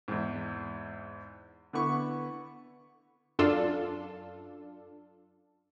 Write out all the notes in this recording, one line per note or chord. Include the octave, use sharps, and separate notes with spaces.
E2 G#2
D3 B3 E4 C#6
F#2 D4 F4 A4